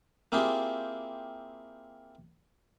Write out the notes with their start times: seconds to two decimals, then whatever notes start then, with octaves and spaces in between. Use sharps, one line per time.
0.32 A#3 C4 E4 F4 G4 G#4